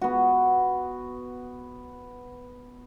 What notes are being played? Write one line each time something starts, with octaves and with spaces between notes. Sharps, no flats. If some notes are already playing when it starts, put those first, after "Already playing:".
B3 F#4